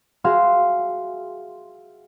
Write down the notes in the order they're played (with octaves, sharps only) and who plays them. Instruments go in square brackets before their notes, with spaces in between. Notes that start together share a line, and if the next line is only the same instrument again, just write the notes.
[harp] F#4 G#4 E5 F5 C6 E6